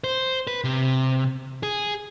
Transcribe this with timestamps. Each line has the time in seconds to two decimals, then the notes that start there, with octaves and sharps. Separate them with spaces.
0.04 C5
0.47 B4
0.64 C3
1.63 G#4